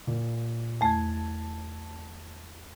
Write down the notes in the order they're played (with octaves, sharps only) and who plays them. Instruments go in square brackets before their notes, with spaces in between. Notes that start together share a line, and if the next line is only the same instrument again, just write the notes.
[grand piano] A#2
[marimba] E2 A3 [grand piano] A5 G#6